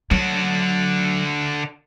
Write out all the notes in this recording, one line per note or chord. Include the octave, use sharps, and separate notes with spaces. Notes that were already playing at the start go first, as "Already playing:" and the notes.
D3 F#3 F#4